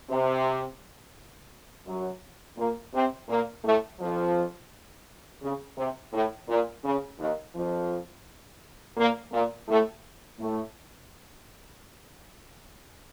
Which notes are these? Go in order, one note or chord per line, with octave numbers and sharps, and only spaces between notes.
C3
F#2 F#3
A#2 A#3
C3 C4
A#2 A#3
A2 A3
F2 F3
C#3
C3
A2
A#2
C#3
D#2 D#3
F2 F3
A#2 A#3
A#2 A#3
A2 A3
A2 A3